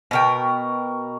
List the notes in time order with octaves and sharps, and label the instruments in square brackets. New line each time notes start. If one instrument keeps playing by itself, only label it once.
[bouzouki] B2 A#4 G5